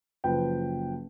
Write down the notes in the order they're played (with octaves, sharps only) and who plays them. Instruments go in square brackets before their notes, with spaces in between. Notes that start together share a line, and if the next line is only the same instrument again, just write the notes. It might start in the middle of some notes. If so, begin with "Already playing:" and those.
[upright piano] F#1 F3 B4 G5